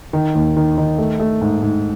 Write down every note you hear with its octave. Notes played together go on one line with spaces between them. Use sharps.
D#3
D#2
D#3
D#3
A3
A3
G#2
G#2